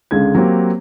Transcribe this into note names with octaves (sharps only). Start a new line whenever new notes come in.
C#2 D3 G#3 G#6
F#3 A#3 C4 G4